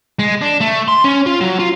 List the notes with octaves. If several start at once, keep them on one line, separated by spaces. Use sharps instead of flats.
G#3
D4
A3
C6
C#4
F4
F#3
F4